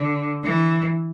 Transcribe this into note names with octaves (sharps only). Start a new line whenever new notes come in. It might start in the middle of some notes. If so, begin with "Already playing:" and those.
Already playing: D3
E3